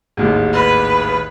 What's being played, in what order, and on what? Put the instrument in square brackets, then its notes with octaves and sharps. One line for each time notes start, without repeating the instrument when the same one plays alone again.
[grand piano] A1 D#2 G#2
[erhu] B4